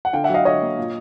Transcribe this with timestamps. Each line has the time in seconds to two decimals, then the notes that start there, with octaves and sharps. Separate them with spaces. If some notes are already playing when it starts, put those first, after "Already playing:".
0.05 F#5
0.13 D3 F5 G5
0.24 E5 F#5
0.29 F#3
0.34 D#5 F5
0.45 D3 C#5 D#5
0.62 A#3
0.78 A#2